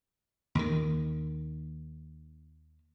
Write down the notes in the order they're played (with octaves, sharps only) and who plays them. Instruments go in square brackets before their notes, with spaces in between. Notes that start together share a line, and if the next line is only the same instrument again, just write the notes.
[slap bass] D#2 D#3